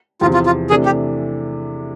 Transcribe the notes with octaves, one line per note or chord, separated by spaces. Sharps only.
E2 C3 F3 F4
F4
F4
C3 E3 A3 D4 G#4
G4